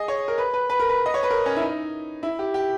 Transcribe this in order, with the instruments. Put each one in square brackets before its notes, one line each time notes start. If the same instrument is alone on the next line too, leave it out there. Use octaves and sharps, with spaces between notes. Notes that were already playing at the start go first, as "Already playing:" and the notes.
Already playing: [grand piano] G#4 D#5
C#5
A#4
B4
B4
B4
A#4
B4
D#5
C#5
B4
A#4
C#4
E4
D#4
E4
G4
G4